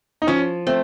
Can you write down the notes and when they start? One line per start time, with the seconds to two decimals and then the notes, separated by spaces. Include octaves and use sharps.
0.22 D#4
0.27 F3 C#4
0.67 A3 C4